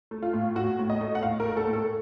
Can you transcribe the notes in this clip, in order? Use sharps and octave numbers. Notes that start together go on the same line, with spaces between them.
A3
F4
A2
A2 F#4
A2
D#5
A3
F#5
A2 F5
A#4
A3
A4
A2
A4